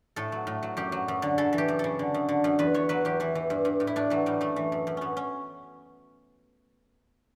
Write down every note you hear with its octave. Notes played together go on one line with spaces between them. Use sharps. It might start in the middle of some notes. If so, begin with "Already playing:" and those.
A2 A4
F#3
A2
F#3
F#2 G4
F#3
F#2
D3
C#3 A4
E3
G4
F#2
C#3 A4
D3
F#2
D3
F#2
E2 B4
E2 C#5
F#3 B4
E2 G4
E3 E4
E3
G2
G2
A2
E4
A2 D4
E3 F#3
A2 G3
F#2 A3
E3
F#2
F#2
F#2 B3 C#4
C#4